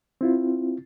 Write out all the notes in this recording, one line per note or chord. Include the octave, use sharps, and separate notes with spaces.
C4 E4 F4